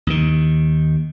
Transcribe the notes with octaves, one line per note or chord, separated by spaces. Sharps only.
D#2 D#3